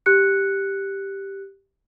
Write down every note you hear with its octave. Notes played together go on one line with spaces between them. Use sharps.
G4 F#6 C#7